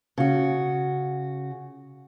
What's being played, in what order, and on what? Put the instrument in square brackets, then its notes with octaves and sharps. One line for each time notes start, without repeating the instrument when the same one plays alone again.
[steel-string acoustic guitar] C#3 F#4